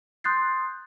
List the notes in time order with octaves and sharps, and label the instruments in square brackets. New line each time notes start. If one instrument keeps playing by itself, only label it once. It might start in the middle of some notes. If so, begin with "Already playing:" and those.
[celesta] C6 D#6 F#6 G6 A6 C7